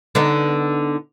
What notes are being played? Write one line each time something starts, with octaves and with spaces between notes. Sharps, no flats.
D3 B3 D#4